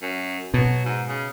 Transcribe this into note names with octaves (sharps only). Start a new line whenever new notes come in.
F#2
B2 F#3
G#2
C#3